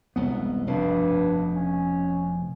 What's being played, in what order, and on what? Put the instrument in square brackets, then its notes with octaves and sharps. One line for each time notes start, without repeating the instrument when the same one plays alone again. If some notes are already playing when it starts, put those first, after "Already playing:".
[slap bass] E1 C2 B3
[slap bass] F1 B2 [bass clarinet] G2
[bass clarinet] C#4